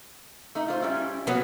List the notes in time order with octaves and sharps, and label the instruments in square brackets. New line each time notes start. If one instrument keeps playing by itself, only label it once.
[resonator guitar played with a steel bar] A3 D#4
F4 C5
G3 C#4 E4
[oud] F#3 B3